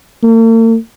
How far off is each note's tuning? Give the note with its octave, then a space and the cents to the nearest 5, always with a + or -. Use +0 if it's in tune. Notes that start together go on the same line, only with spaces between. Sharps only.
A#3 -45